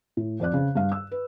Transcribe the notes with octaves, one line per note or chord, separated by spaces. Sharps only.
A2
F2 C4 D5 F#6
C#3
G2 F5
E6
B4